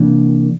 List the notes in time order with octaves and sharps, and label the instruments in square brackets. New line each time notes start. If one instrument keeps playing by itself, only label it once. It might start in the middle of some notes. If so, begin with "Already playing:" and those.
Already playing: [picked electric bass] C3 E3 A#3 D4